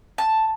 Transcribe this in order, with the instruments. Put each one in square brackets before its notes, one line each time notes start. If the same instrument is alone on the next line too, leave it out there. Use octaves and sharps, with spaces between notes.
[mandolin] A5